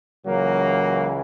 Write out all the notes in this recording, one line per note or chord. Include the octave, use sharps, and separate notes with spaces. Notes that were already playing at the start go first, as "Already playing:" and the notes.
C#2 C#3 E3 F#3 A#3